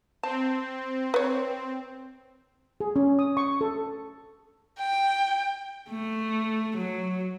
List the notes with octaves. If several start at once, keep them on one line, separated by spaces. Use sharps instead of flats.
C4 A5
B4 C#5
G#4
C#4
D#6
C#6
A4
G5
A3
F#3